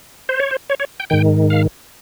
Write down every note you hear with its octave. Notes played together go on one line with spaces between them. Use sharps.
C5
C#5
C5
C#5
C#5
G5
G#2 D#3 G5
F5